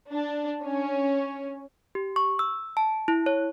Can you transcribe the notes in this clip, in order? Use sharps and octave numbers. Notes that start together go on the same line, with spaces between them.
D4
C#4
G4
C#6
E6
A5
E4
C#5